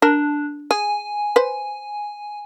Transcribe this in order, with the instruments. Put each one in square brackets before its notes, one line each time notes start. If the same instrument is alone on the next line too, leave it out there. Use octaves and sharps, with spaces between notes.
[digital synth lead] D4 [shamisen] A#4
[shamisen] G#4 [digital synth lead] G#5
[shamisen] B4 C5